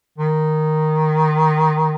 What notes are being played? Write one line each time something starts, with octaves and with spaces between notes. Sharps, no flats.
D#3